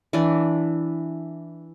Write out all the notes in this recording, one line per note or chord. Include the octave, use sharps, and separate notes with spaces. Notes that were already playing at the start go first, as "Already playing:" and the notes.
E3 D4